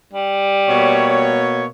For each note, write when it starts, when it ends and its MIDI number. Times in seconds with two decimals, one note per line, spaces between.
0.13 1.35 55
0.69 1.66 47
0.69 1.66 58
0.69 1.66 73